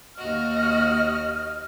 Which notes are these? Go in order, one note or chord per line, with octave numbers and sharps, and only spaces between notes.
D#2 F#4 D#5 F6